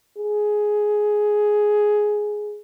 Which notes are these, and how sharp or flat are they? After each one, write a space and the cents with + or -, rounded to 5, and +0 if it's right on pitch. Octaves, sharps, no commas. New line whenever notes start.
G#4 +10